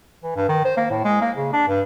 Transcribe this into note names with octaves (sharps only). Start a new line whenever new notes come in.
E3
G2
D#3
C5
A#3
A2
G#3
A#3
C#3
D4
G2